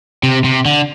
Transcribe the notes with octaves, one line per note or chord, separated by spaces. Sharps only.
C3
C3
D3